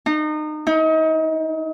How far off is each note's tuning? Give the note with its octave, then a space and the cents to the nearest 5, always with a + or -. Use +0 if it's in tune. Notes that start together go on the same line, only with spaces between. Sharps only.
D#4 -30
D#4 +35